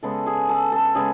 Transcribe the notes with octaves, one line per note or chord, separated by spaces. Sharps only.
C#3 G#3 B3 A4
G#4
A4
A4
C#3 G#3 B3 G#4